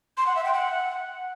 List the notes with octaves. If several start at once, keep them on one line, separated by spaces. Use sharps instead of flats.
C6
F#5
E5
G5
F#5